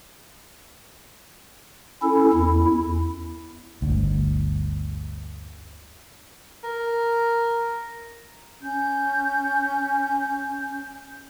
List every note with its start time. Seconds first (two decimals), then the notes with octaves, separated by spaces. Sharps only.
2.03 C#4 E4 A4
2.34 E2 E4
3.82 G1 D2
6.64 A#4
8.61 C#4 G6